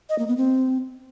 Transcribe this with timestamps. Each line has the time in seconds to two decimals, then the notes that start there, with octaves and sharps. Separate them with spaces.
0.09 D#5
0.19 A#3
0.28 B3
0.37 C4